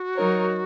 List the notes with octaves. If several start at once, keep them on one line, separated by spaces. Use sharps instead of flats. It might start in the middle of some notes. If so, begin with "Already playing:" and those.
Already playing: F#4
F#3 D#4 A#4 C#5